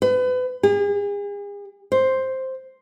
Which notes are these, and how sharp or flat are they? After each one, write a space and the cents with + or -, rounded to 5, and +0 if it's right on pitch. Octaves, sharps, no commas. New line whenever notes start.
B4 +35
G#4 -40
C5 +5